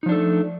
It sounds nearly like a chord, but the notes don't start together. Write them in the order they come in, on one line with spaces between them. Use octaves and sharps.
D#4 F3 D4 A4 A3